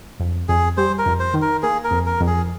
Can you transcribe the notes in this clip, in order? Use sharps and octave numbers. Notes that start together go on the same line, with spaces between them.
F2
F2 G#4
G3 C5
A#4
F2
C5
D#3
A#4
A#3 G#4
A#4
F2
A#4
F2
G#4